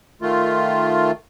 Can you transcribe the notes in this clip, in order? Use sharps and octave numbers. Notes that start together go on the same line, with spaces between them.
D#3 A3 F4